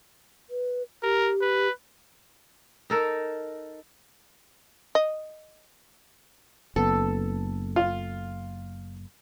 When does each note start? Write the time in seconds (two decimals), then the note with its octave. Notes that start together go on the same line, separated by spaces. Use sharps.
0.50 B4
1.03 G4 A#4
1.42 B4
2.90 D#4 A4 A#4
4.95 D#5
6.76 F#1 B3 A4
7.76 F4